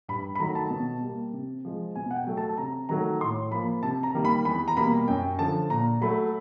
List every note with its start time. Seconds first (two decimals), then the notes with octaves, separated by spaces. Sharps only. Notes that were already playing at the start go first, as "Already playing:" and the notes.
0.08 G2 B5
0.35 B5
0.40 D#3 F#3 A3 A#5
0.55 A5
0.70 B2
1.02 G3 A#3
1.33 C3
1.65 F3 G#3
1.95 B2 G#5
2.11 F#5
2.16 G5
2.27 F#3 A3
2.37 A5
2.49 A5
2.58 C3 A#5
2.89 D#3 F#3 A3 A#5
3.21 A2 C6
3.51 F3 A#3 B5
3.83 C3 A5
4.03 A#5
4.15 D#3 G3 A#3
4.25 B5
4.45 E2 B5
4.68 A#5
4.77 B2 G3 A#3 B5
5.08 F#2 G5
5.39 D3 F3 A5
5.70 A#2 A#5
6.01 F#3 A3 B5